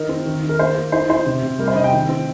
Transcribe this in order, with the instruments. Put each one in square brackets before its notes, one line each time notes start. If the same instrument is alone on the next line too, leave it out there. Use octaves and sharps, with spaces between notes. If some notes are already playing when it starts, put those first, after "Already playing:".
Already playing: [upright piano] D#3 D#4 A#4
C4
D#3
D#3
A#4
A#3 C5
A#3
D#4 C5
D#4 C5
C3
C3
G3 A#4
C5
C3 D#5
G5
D#3
C4